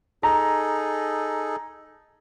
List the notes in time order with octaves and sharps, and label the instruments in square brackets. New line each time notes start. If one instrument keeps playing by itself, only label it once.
[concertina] D#4 G#4 A4 [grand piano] A#5